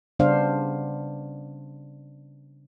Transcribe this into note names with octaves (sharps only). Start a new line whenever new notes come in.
C#3 G3 B3 D4 C5 F5